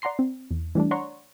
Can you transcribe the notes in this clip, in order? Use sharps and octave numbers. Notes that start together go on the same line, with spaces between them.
D5 F#5 A#5 C6 C7
C4
E2
E3 G3 A3 D4
C#5 D5 F#5 A#5 C6 C#6